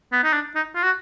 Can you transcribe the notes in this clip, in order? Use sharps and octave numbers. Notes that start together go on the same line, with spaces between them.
B3
D#4
D4
D#4
F4
F#4